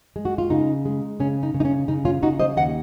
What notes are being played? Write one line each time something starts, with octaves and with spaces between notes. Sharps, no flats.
G#3
F#4
F4
C#3 D#4
G#3
C#3 C#4
D#4
C#3
D#4
C#4
C#3 D#4
C#4 F4
C#3 D#4 F#4
C5 D#5
D#2 D#5 F#5